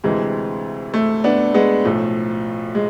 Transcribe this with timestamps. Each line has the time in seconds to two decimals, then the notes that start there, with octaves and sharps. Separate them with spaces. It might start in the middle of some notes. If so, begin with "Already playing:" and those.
0.04 D2 C3 E3 G#3
0.94 A3
1.24 B3 D4
1.54 G#3 B3
1.85 B1 A2 F3 A3
2.75 G#3